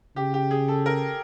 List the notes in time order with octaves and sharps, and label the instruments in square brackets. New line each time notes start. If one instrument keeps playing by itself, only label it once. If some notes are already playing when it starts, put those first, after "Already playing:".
[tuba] C#3 [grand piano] G4
[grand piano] G4
G#4
A4
A#4